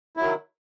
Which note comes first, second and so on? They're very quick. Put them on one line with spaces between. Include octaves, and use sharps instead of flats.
E4 F#3 D#3